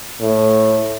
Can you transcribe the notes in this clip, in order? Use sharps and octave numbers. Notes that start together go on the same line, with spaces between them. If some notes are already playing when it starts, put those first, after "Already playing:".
A2